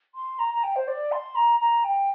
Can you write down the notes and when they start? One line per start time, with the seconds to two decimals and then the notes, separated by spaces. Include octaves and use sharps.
0.15 C6
0.39 A#5
0.54 A#5
0.64 G5
0.76 C5
0.88 D5
1.12 C6
1.35 A#5
1.60 A#5
1.84 G5